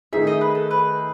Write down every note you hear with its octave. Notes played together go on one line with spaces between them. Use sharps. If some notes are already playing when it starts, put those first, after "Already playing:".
D#3 A3 D#4 G#4 E5
D#5
B4
A4
B4